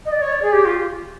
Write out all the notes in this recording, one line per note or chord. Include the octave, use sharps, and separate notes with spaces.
D#5
D5
C#5
D5
G#4
G4
F4